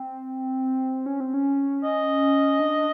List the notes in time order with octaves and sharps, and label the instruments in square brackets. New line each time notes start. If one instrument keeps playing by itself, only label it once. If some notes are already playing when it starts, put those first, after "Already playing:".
Already playing: [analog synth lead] C4
C#4
C4
C#4
[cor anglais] D#5
[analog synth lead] D4